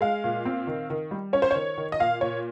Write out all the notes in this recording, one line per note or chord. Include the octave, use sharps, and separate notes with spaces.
G#3 F5
A#2
C4
D#3
D#3
G3
C#4 C#5
C5
D#3 C#5
D#3
D#5
A#2 F5
A#2 C#5